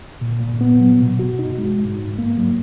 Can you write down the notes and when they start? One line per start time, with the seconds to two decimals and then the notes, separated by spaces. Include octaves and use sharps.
0.21 A#2
0.40 A#2
0.61 B3
0.80 F#3
1.00 B2
1.19 F#4
1.39 D#4
1.58 G#3
1.79 G#2
1.99 G#2
2.18 A#3
2.38 F#3